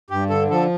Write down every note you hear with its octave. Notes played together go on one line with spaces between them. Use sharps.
G2 G4
D3 A4
F3 A4